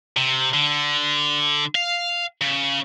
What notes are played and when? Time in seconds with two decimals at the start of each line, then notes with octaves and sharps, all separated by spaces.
0.17 C3
0.54 D3
1.75 F5
2.41 C#3